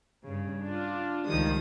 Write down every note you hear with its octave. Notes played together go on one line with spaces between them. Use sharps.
G2 C#3
D4 F4
C#2 D#3 F3 G3 D#6